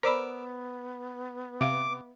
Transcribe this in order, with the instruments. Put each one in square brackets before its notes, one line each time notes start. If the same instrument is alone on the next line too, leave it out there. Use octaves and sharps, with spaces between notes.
[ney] B3 [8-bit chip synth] A#4 D6 E6 [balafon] C5 D5 B5
[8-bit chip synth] C3 [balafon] E5 F5 [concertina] D6